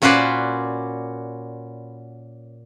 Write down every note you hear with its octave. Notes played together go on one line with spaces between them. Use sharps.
A#2 C#4 F#4 B4 C5 D5